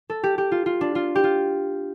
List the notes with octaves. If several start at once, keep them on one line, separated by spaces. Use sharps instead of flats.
A4
G4
G4
F4
F4
D4
F4
G4
F4